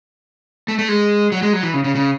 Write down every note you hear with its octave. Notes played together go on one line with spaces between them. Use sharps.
A3
A3
G#3
F#3
G#3
F#3
E3
C#3
C#3
C#3